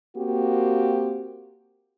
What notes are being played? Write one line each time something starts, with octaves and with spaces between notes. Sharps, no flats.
A#3 C4 F#4 G4